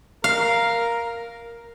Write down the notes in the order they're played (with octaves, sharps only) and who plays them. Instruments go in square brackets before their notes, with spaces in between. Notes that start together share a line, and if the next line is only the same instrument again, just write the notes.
[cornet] A#4 [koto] F5